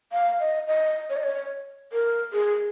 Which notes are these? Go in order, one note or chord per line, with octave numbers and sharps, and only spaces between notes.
F5
D#5
D#5
C#5
D#5
C#5
A#4
G#4